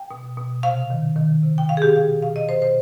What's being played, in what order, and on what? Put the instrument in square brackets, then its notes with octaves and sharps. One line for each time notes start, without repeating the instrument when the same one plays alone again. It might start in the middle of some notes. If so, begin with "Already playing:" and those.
Already playing: [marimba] G5
B2
B2
C3 F5
D#3
D#3
C3
G5
B2 F5
G#4
G4
B2 F5
B2 F5
D#5
B2 C5
C5